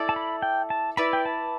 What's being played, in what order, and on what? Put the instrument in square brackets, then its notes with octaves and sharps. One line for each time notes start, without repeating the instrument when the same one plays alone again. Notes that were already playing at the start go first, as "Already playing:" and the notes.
Already playing: [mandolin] E4 A4 D5
[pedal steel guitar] A5
B5
G5
A5
[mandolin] E4 B4 D5 [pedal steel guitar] B5
[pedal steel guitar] G5
A5